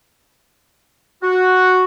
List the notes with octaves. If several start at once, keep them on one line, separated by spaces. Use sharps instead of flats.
F#4